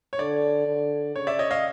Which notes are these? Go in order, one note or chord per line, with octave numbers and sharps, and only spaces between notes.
C#5
D3 D5
D3
C#3 C#5
D5 E5
C#5 D#5
D#5 F5